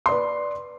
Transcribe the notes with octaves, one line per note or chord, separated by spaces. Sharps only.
B4 D5 C6